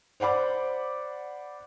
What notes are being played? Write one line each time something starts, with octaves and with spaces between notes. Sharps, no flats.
C5 D5 F#5 B5 D6